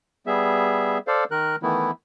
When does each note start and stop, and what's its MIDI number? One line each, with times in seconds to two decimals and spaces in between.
0.27 0.98 55
0.27 0.98 59
0.27 0.98 68
0.27 0.98 76
1.07 1.24 69
1.07 1.24 72
1.07 1.24 74
1.07 1.24 77
1.31 1.56 51
1.31 1.56 70
1.31 1.56 90
1.63 1.91 51
1.63 1.91 52
1.63 1.91 57
1.63 1.91 59
1.63 1.91 64